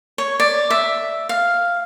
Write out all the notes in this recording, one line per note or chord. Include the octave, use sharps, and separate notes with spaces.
C#5
D5
E5
F5